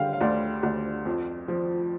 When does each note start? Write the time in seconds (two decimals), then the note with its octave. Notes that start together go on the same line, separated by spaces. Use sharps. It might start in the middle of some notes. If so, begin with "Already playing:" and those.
Already playing: D3 G3 F5 G5
0.13 F5
0.20 D2 D5
0.63 D2
1.05 F2
1.48 F3